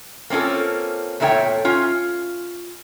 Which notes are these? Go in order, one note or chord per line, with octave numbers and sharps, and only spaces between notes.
A#3 C4 C#4 F4 A4
E2 A#2 A3 E4 C#5 G5
C#4 F4